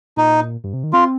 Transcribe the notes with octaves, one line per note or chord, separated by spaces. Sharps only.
A#2 D#4
G2
C3
D#3
C4 F4